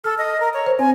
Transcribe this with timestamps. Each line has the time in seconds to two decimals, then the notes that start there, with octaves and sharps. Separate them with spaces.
0.04 A4 F6
0.18 D#5
0.40 A#4
0.54 C#5
0.66 C5
0.79 C4 G#5